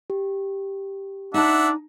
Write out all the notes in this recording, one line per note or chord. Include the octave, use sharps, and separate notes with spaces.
G4
D4 D#4 E5 F#5 A5